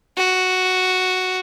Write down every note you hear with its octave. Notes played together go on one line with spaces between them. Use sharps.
F#4